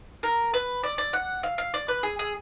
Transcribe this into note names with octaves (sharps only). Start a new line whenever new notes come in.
A#4
B4
D5
D5
F#5
F5
F5
D5
B4
G#4
G#4